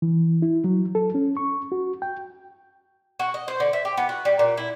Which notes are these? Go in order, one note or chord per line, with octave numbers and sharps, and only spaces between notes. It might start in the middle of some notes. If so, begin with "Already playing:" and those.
E3
E4
F#3
A4
C#4
C#6
F#4
G5
F#4
D#5
C5
D3
E5
G4
B3
F#4
G3
A#2
E4